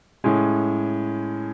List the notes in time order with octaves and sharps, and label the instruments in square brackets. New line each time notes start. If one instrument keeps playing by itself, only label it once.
[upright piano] A2 G#3 C#4